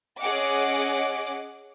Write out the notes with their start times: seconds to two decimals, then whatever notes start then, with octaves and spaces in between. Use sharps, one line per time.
0.20 C#4 G#4 D#5 F#5 D6